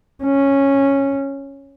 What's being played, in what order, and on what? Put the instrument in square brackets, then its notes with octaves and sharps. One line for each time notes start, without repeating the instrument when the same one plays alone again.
[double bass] C#4